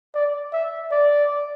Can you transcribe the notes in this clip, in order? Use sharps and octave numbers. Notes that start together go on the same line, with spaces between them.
D5
E5
D5